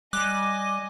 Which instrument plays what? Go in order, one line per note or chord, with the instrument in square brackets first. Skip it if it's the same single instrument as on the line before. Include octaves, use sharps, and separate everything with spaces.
[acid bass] G3 [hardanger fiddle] D#5 G#5 [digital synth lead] D6 [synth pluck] F#6